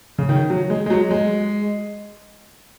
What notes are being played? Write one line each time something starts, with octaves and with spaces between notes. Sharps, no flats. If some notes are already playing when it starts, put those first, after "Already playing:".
C#3
D#3
F#3
G#3
G#3
F#3
G#3